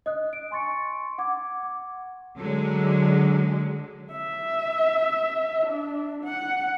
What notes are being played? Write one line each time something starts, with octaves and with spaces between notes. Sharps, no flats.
D#5 D#6 F#6
D7
G#5 C6 C#6 A6 C#7
F#5 D6 G#6
D6
D3 F#3 G#3
E5
D4
F#5